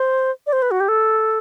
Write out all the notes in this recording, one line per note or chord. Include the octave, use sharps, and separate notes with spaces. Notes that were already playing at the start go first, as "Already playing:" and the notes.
Already playing: C5
D5
C5
B4
F#4
G4
A4